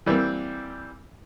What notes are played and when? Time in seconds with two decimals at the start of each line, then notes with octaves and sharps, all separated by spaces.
0.06 E3 G3 A#3 C4